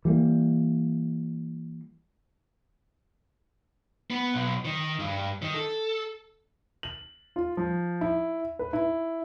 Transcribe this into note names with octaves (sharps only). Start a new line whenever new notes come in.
E3 G3 A3 A#3
B3
B1
D#3
G2
D#3
A4
F#7
F4
F3
E4
B4
E4